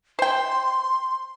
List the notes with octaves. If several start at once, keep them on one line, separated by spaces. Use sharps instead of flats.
C5 G5 C6